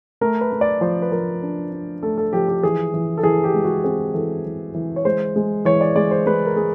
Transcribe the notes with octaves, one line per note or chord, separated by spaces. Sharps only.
A3 A#4
B4
A3
D5
F3 C5
B4
F3 A#4
D4
D4
A3 A4
A4
F3 G4
G4
E3 G#4
E3
A4
E3 G#4
G4
G#3
F#4
C4 G#4
E3 A4
E3
E3
C#5
G#3 C5
G#3
E3 C#5
D5
G#3 D5
C5
G#3 B4
A#4
G#3 G#4